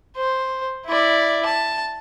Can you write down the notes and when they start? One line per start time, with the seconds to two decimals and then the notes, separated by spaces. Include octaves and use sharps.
0.17 C5
0.86 E4 D5
1.45 A5